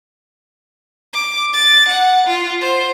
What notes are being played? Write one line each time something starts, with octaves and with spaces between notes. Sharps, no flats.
D6
A6
F#5
F4
C5